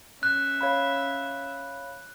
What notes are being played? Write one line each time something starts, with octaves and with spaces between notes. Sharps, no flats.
C#4 E5 F#6
C#5 F5 B5